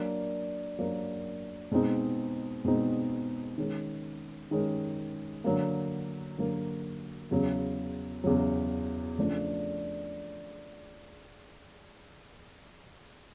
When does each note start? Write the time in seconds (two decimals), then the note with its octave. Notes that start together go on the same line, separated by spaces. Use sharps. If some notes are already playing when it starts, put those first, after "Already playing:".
Already playing: F#3 A#3 D4
0.79 F#3 A#3 D4
1.72 B2 G#3 C4 D#4
2.65 B2 G#3 C4 D#4
3.58 D#3 G#3 C#4
4.51 D#3 G#3 C#4
5.44 D3 F#3 A#3
6.38 D3 F#3 A#3
7.31 E2 C#3 F#3
8.24 E2 C#3 F#3
9.18 C#3 F3 A3 D4